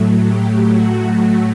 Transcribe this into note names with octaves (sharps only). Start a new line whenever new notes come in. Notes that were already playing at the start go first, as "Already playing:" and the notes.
Already playing: A2 F#3 A3
G4
F#4
F#4